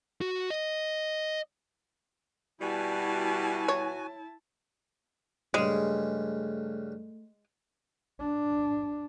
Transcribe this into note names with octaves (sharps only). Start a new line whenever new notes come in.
F#4
D#5
B2 G3 E4 F#4 G#5 A5
C#5
G2 C#3 G#3 A3
D4